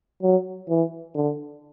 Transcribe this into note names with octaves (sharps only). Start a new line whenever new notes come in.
F#3
E3
D3